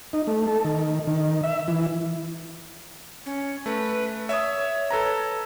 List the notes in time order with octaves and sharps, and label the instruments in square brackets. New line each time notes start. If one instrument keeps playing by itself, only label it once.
[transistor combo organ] D#4
A3
A4
D#3
D#3
E5
E3
[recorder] C#4
[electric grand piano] A3 [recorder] B4
[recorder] C#5 [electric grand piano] E5 D#6
[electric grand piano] A4 B4 A#5